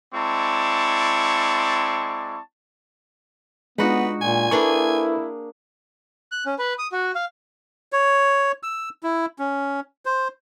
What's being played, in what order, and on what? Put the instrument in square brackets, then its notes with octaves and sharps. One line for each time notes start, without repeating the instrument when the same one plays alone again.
[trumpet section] G#3 C4 E4 D5 A5 C#6
[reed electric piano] G#3 D4 F4 [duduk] B3 [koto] D#4 F#4 [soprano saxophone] B4
[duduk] A#2 [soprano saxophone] G#5
[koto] A#3 D4 G#4 [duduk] E4 [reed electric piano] A4 B4 C#6
[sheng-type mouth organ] F#6
C#4
B4
D#6
F#4
F5
[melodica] C#5
E6
E4
C#4
C5